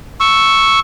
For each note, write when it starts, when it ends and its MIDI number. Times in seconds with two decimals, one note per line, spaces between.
0.20 0.80 85
0.20 0.80 88